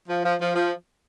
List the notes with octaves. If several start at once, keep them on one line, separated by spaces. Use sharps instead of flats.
F3
F3
F3
F3